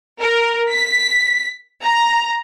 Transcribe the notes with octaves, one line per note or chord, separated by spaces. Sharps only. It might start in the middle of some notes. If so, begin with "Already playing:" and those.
A#4
B6
A#5